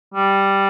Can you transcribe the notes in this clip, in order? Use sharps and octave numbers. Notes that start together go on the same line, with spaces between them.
G3